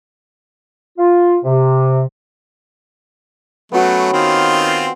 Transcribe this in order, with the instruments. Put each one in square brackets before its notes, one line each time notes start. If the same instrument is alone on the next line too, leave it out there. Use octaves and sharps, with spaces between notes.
[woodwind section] F4
C3
[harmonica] F#3 A3 [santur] B3 C#4 F#4
[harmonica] D#3 C4 F4